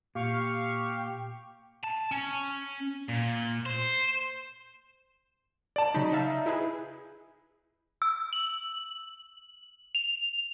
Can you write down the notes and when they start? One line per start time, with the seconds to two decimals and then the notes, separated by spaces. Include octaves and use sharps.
0.15 A#2 G4 F5 C#6
1.84 A5
2.11 C#4
3.09 A#2
3.66 C5
5.76 D5 A5
5.94 C#3 F#3 D#4 B5
6.12 E5 F5 A5
6.46 E4 G#4 B4
8.02 E6
8.33 F#7
9.95 F7